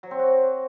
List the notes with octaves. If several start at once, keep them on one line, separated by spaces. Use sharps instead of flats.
F#3
C4
F#4